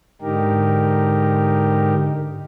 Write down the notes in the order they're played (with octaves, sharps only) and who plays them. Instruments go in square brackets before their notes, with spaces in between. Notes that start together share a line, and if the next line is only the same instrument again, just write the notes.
[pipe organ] G#2 D3 D#4 G4 A#4